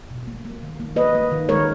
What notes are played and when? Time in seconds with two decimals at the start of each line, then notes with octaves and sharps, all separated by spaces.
0.10 B2
0.27 A#3
0.45 A#3
0.63 D#3
0.80 A#3
0.96 A#3 B4 D#5
1.15 A#3
1.31 D#3
1.49 G#3 A#4 C#5